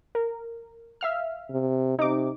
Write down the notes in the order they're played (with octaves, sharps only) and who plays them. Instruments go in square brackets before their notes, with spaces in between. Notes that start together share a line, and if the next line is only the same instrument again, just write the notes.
[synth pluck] A#4
E5 F5 F6
[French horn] C3
[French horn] C3 [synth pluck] D#4 D6